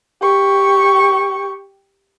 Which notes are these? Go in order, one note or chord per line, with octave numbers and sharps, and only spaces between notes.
G4 C#6